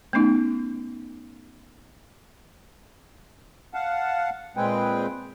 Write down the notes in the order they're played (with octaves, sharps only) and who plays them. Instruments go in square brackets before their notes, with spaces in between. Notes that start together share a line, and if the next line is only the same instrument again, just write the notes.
[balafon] A3 B3 C#4 D#4
[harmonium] F5 F#5 A5
A#2 G#3 C4 G#4 B4 G5